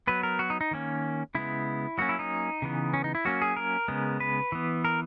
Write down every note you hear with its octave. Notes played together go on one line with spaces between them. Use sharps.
F#3 B3 B4
A#4
F#4
D#4
D#4
D#3 A#3 C#4
C#3 G#3 B3 E4
F#3 A#3 C#4 F#4
E4
D#4
C#3 E3 B3
C#4
D#4
E4
F#3 A#3 C#4 F#4
G#4
A#4
C#3 G#3 B3
B4
E3 B3
A#4